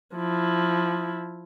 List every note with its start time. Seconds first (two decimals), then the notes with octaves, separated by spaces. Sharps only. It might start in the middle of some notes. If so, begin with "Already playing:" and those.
0.15 F3 E4